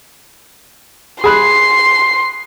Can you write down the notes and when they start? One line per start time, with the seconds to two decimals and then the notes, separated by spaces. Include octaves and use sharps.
1.24 G#4 B5 C6 F#6